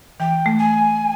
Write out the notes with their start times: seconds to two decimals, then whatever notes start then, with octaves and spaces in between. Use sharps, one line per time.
0.20 E3 G5
0.46 A3
0.59 G#5